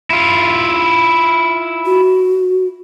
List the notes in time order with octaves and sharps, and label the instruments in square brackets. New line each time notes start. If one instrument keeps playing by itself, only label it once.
[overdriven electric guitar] E4 F4
[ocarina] F#4